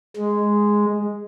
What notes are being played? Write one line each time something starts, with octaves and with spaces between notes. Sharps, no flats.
G#3